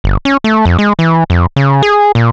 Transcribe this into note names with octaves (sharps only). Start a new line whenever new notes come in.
G1
C#4
A3
F2
G#3
E3
F2
C#3
G#4
A#2